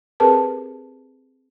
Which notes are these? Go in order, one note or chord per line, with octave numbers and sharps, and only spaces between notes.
C4 G4 G#4 A#4 B4 A5